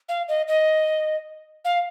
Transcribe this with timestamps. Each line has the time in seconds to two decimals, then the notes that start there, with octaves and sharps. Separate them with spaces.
0.09 F5
0.28 D#5
0.48 D#5
1.65 F5